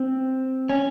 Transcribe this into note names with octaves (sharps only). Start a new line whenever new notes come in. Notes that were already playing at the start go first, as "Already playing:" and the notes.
Already playing: C4
C#4